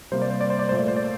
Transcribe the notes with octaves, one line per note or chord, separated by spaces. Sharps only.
C3 G3 A#3 C5
D5
C5
D5
C5
D5
A#2 A3 C5
D5
C5
D5